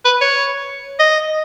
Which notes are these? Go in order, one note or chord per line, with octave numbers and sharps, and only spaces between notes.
B4
C#5
D#5